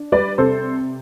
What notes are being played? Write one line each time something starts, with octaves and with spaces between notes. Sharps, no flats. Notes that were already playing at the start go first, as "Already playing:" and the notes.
Already playing: D4
G3 B4 D5
C3 A4 C5